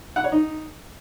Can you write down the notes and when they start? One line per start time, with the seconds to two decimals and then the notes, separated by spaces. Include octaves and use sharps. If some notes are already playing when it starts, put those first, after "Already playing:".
0.16 F#5
0.24 C#5
0.32 D#4